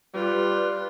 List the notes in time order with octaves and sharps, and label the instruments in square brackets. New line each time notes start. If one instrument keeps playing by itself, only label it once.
[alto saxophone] G3 [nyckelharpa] F4 [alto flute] B4